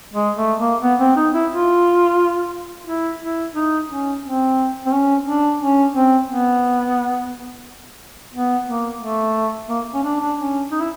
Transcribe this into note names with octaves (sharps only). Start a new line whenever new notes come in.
G#3
A3
A#3
B3
C4
D#4
E4
F4
E4
E4
D#4
C#4
C4
C4
C#4
D4
C#4
C4
B3
B3
A#3
A3
A#3
C#4
D4
D4
C#4
D#4
E4